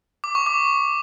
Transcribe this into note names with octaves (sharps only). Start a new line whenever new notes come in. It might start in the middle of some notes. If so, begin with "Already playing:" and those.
D6
C#6
D6